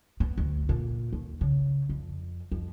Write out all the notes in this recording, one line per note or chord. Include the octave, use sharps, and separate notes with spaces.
B3
D2
A#2
D#2
C#3
F2
F2